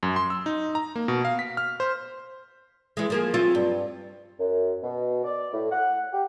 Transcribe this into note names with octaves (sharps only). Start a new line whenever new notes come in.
F#2
C6
E6
D#4
A#5
A#3
B2
F5
B6
F6
C5
E3 G#3
F3 A#3 G#4
F#3 C4 F4
G2
F#2
B2
D5
A2
F#5
G4